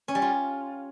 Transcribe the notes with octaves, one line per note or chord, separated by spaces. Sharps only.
C#4
G3
F4